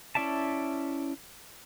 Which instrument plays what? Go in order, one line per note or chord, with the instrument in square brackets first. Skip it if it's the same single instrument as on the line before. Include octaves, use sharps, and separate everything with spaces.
[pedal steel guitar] C#4 E4 D5 E5 A5